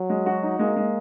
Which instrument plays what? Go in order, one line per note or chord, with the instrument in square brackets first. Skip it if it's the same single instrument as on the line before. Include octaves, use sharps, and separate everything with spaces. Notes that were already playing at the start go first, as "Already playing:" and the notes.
Already playing: [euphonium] F#3
[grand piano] G#3
F#4
D#4
[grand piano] G#3 [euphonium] A#3
[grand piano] G#3